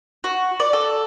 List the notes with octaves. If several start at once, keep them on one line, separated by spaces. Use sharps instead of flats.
F#4
D5
A4